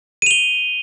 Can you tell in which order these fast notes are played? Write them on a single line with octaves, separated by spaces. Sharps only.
D#7 F7 G7